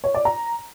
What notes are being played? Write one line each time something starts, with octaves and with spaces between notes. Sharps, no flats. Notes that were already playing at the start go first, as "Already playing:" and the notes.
C#5
D5
A#5